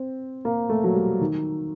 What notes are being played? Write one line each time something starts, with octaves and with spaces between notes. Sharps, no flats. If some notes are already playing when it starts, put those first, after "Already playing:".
Already playing: C4
A#3
A3
F#3
G3
D#3